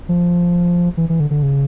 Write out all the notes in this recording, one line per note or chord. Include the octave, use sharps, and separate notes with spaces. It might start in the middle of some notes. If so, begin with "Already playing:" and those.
F3
E3
E3
D3
D3
C#3